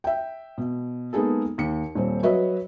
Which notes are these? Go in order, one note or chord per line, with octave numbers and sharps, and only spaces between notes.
E5 G5
B2
G#3 A#3 B3 D#4 G#4 A4
D#2 C#7
D#1 A#2 C4 C5
F#3 F#4 B4 C#5 D#5 E5